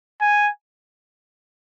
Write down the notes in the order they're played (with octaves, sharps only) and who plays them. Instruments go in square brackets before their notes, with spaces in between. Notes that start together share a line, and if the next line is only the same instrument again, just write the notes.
[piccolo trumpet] G#5